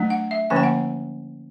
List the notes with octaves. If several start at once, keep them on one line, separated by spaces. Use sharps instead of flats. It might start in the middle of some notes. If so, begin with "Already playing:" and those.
Already playing: F#3 A3 D4
F#5
E5
D3 F3 A#3 C#4 G#5
G5
F#5